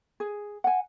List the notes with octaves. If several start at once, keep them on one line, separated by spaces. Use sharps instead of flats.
G#4
F#5 G#5